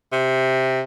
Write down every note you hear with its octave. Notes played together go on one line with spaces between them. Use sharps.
C3